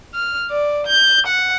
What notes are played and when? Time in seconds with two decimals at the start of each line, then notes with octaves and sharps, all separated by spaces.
0.14 F6
0.50 D5
0.87 G6
1.27 F#5